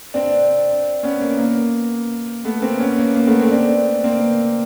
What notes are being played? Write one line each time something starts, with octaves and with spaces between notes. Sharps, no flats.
C4 D4
B3 C#4
A#3
A#3
A3 B3
A#3 C4
B3 C#4
A#3
A#3
A3 B3
A#3 C4
C4 D4
A#3 C4